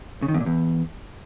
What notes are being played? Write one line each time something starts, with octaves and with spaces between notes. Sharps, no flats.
C#3
D#3
E2
A#2
E2